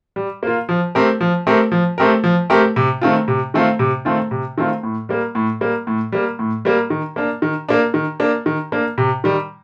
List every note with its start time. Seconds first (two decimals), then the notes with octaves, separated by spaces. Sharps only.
0.16 G3
0.43 A#3 F4
0.69 F3
0.95 A3 C4 G4 A#4
1.21 F3
1.47 A3 C4 G4 A#4
1.72 F3
1.98 A3 C4 G4 A#4
2.24 F3
2.50 A3 C4 G4 A#4
2.76 C3
3.01 D#3 A3 C4 F4
3.28 C3
3.54 D#3 A3 C4 F4
3.79 C3
4.05 D#3 A3 C4 F4
4.31 C3
4.58 D#3 A3 C4 F4
4.83 A2
5.09 G3 A#3
5.35 A2
5.61 G3 A#3
5.87 A2
6.12 G3 A#3
6.39 A2
6.65 G3 A#3
6.90 D#3
7.16 A#3 D4
7.42 D#3
7.69 A#3 D4
7.94 D#3
8.20 A#3 D4
8.46 D#3
8.72 A#3 D4
8.98 C3
9.24 D#3 G3